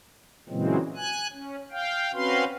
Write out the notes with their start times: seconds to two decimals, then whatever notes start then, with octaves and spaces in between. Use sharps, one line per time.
0.49 A#2 C#3 E3 F#3 G#3 C4
0.96 G#5 F#6
1.33 C#4
1.71 F5 G5
2.13 C4 C#4 F#4 B4 F5 C6